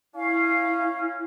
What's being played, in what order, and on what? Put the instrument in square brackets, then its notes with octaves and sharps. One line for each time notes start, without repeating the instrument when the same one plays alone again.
[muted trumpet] C#4 [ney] E4 [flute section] F5